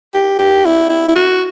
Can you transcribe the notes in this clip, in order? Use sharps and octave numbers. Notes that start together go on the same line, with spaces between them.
G4
G4
E4
E4
E4
F#4